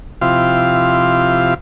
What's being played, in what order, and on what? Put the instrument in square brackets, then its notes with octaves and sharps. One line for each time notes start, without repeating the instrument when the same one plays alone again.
[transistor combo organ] C3 F3 E4 F4 G4 F5